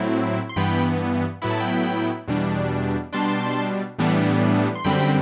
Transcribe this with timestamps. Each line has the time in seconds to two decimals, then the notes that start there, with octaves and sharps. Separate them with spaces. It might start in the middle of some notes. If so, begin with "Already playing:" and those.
Already playing: A2 F#3 C4 E4
0.49 C6
0.56 G2 E3 B3 G5 B5
1.42 A2 F#3 B3 E4 B5
1.50 A5
1.60 G5 B5
2.28 E2 B2 G3 D4
3.13 B2 G3 D4 A5 C6
3.99 A2 E3 G3 B3 D4
4.75 C6
4.85 F#2 D3 G3 C4 G5 B5